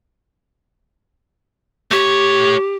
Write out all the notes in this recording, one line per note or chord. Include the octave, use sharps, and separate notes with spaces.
A3 G4 C#5